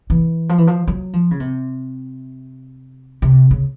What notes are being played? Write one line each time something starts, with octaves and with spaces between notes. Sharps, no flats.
E3
F3
E3
F3
F#3
F3
C#3
C3
C3
C#3